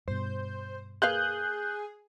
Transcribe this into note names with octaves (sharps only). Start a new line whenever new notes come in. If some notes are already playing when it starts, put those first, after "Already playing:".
G2 B2 C5
A#3 G#4 B4 F5 F#6 G6